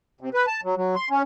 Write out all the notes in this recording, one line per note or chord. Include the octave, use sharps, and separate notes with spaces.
C3
B4
A5
F#3
F#3
C6
C#4